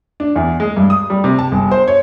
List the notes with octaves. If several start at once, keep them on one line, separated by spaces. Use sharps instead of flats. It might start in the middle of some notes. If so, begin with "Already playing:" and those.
D4
E2
G#3
G2
D#6
G3
C3
A5
G1
C5
C#5